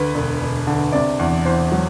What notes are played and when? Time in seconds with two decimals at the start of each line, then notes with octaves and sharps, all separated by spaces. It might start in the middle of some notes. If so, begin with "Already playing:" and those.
Already playing: D2 B4
0.14 E1
0.41 E1
0.67 D3
0.92 C3 D5
1.19 E2
1.45 E2 C5
1.72 F#3